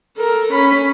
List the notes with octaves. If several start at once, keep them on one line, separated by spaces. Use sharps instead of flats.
A4 A#4
C#4 B5